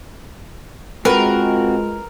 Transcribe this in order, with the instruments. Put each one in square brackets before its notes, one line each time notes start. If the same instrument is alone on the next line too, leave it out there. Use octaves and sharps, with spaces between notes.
[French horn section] G#3 F4 [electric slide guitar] C4 F#4 [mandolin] A#4 [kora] B4